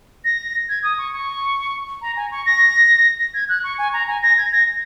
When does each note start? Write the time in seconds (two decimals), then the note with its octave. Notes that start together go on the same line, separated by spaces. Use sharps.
0.25 A#6
0.69 G#6
0.83 D#6
0.98 C#6
1.13 C#6
2.02 A#5
2.17 G#5
2.32 C#6
2.46 A#6
3.34 G#6
3.49 F#6
3.64 C#6
3.79 G#5
3.93 A#5
4.08 G#5
4.23 A#6
4.38 G#6
4.52 A#6